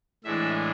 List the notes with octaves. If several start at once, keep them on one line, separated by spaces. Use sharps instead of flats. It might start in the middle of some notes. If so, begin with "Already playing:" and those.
A2 E3 G#3 D4 E5